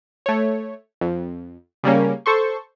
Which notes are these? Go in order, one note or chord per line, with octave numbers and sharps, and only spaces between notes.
A3 C#5
F2
C#3 G3 A#3 C#4
A4 C5 C#6